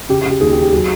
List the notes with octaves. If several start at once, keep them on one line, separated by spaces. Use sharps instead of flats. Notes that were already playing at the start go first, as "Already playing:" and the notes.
C#3 G4
C#3 G4
D#2 G#4
G4
D#2
G4
F#3 G#4